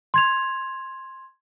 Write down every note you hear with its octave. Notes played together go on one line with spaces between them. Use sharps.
C6 G#6 F7